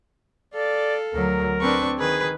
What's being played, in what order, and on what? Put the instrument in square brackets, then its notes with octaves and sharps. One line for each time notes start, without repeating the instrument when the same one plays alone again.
[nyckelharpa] A4 F5 [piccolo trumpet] D5
[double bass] D2 F#3 [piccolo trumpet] A#4
[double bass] C4 D4 [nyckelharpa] B4 C#6
[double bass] D#3 [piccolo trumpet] G#4 [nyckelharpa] B4